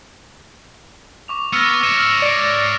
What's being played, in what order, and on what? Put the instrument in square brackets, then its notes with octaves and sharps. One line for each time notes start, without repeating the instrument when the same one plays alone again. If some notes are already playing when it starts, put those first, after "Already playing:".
[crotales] C#6 D6 F7
[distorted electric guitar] B3 [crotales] E6 F6 A#6
[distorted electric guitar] C#5 E5
[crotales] F6 F7 F#7
[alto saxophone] D5